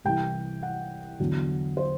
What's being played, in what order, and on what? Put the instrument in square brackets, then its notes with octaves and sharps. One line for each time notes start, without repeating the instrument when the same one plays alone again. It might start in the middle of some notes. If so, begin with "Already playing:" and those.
[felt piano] C2 C3 E3 G5
F#5
E2 D3 F#3
C5